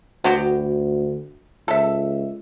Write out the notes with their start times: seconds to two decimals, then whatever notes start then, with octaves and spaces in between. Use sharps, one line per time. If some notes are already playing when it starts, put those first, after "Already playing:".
0.24 D2 B3 F#4 G4
1.68 C#2 A4 E5